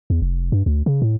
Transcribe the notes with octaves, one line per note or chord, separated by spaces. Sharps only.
E2
F1
G2
D2
C#3
A2